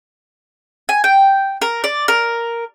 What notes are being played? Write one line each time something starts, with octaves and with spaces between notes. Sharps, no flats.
G#5
G5
A#4
D5
A#4